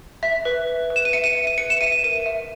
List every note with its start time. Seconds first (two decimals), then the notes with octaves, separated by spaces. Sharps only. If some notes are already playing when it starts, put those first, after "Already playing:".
0.23 E5 B6
0.45 B4
0.67 B4
0.90 B4
0.96 E7
1.05 D#7
1.13 E5 C#7
1.24 D#7
1.35 E5
1.47 D#7
1.58 B4 C#7
1.70 E7
1.81 E5 D#7
1.92 D#7
2.04 A#4 D#7
2.26 E5